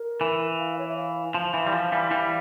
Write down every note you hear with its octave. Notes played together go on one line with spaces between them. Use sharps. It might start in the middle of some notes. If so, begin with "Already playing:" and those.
Already playing: A#4
E3
F5
C#5
E5
F5
F3 F5
E3
G3
F3
E3 G3
E3 G3